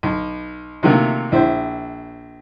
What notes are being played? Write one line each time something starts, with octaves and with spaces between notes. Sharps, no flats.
B1
C3 D#3 F3 F#3 A3 A#3
A#1 E4 C5